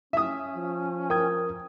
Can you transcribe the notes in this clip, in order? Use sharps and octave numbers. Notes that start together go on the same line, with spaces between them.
C#4 E5 D#6
F3
A#4 G5 D#6 G#6